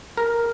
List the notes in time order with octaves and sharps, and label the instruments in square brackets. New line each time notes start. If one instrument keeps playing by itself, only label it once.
[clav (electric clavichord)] A#4